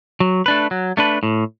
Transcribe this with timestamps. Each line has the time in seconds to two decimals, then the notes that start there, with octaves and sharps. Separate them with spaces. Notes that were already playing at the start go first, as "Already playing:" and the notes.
0.20 F#3
0.46 A3 D4 B4
0.71 F#3
0.97 A3 D4 B4
1.23 A2